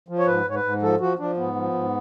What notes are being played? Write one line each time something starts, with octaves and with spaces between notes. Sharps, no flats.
F3
C#5
G#2 B4
G#2 C#5
B4
G#2
F3 A4
F3 F#4
F3 D4
G#2 B3
F3
G#2